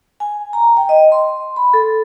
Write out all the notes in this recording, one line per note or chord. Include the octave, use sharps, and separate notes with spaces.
G#5
A#5
G5
D#5
C6
B5
A4